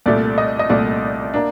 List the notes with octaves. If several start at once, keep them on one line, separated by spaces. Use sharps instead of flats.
C2 A#2 A3 D5
D#5
D#5
C2 A#2 A3 D5
A#3 D4